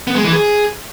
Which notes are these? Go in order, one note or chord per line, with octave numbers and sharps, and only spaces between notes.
B3
G#3
E3
G#4